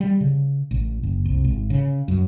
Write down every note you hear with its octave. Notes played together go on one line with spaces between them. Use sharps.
G3
C#3
A1
F#1
C2
G#1
C#3
F#2